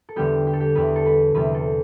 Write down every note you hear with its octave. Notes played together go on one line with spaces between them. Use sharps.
A4
E2 D3 G3 B3 G4
G4
A4
G4
E2 D3 G3 B3 B4
A4
B4
E2 C3 G3 B3 B4
A4